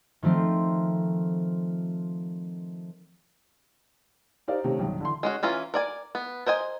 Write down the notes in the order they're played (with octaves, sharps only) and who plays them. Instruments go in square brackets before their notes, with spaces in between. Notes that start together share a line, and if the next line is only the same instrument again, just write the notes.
[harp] D#3 F3 A3 C4 F4
[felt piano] D#4 G4 A#4 C5 D5 F5
C3 D#3 A3 C#4
B1 G2 D#3
D3 E3 C6
[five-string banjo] G#3 C#4 F#4
E3 C#4 F4 A#5
A#4 D5 G#5
B3
A#4 C5 D#5 G#5